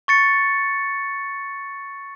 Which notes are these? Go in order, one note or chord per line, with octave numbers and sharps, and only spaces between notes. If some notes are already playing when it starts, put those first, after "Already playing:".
C#6 A6 C#7